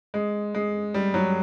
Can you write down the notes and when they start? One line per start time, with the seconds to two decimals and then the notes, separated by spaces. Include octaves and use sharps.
0.14 G#3
0.55 G#3
0.94 G3
1.14 F#3